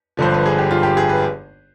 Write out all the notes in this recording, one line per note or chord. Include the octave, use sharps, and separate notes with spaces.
G1 G2 D3 F3 C5
B4
G#4
G4
F4
G4
G#4
B4